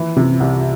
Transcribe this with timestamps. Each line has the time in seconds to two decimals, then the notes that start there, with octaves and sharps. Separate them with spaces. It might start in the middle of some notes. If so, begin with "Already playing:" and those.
Already playing: E3
0.17 C3
0.40 C2